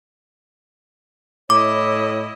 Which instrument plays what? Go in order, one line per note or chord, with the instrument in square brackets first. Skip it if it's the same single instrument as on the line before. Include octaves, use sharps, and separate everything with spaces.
[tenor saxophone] A2 [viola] E4 D#5 [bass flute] C#5 [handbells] D6